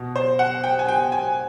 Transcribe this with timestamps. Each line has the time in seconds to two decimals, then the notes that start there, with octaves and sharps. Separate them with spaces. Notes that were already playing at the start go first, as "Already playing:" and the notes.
Already playing: B2
0.16 C5
0.39 F#5
0.64 G5
0.79 G#5
0.88 G5
1.12 G#5